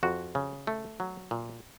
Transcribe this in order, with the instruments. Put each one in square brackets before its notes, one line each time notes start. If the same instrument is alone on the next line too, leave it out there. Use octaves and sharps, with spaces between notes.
[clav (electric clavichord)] F2 F#4
C#3
A3
F#3
A#2